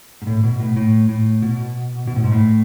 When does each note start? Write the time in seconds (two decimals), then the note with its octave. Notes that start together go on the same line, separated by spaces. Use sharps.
0.22 G#2
0.27 A2
0.44 B2
0.60 A2
0.76 A2
1.09 A2
1.42 B2
2.07 B2
2.16 A2
2.24 G#2
2.32 A2